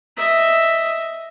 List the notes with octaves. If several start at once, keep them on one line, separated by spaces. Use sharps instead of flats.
D#5 E5